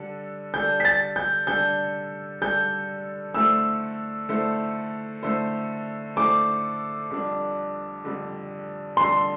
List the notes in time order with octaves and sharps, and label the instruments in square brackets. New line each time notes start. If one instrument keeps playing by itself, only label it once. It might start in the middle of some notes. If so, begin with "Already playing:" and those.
Already playing: [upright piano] D3 G3 D4 A4
[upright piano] D3 G3 D4 A4 [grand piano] G6
[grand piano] B6
A6
G6
[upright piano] D3 G3 D4 A4 [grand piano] G6
[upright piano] D3 G3 D4 A4 [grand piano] G6
[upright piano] D3 A3 E4 A4 C5 [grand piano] E6
[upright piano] D3 A3 E4 A4 C5
D3 A3 E4 A4 C5
[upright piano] D3 A3 E4 A4 C5 [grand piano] D6
[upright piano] F2 D3 G3 D4
F2 D3 G3 D4
[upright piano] F2 D3 G3 D4 [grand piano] C6